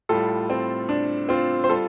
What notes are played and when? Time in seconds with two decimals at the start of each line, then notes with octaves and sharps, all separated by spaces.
0.09 A2 G3 F4 A4
0.50 C4
0.89 D4
1.29 C4 F4
1.64 C5
1.69 G3 F4 A4